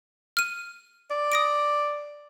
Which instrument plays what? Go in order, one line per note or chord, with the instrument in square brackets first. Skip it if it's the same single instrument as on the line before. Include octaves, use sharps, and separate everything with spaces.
[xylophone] F6 D#7
[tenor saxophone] D5
[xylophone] D#6 A#6 D7